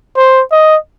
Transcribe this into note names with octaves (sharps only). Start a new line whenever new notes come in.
C5
D#5